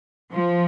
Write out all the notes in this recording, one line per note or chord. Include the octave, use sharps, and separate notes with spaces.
F3